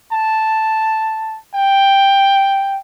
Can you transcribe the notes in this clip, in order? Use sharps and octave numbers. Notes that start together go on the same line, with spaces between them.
A5
G5